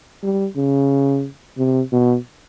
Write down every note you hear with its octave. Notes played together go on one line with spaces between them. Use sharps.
G3
C#3
C3
B2